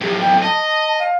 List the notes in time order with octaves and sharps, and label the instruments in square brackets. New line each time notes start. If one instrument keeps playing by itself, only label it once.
[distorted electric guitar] B1 A2 [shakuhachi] G4
[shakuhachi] G5
[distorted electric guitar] D#5 [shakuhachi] A5
[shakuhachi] F5